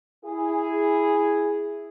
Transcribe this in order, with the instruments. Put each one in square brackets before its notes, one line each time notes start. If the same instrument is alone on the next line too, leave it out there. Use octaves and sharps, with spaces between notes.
[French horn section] E4 G#4